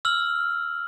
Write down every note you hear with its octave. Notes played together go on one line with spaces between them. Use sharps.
E6 F6 F#7